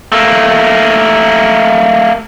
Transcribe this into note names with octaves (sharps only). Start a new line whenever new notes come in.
A3 A#3